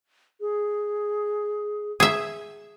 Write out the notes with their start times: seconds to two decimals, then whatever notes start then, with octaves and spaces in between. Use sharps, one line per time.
0.41 G#4
2.00 G#4 E5